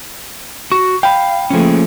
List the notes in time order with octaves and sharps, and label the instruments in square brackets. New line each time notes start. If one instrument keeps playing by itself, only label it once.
[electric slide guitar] F#4 [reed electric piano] C#6
[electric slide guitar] F5 [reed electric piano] G5 B5
[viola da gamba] F3 A3 A#3 [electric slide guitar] C#4 G#4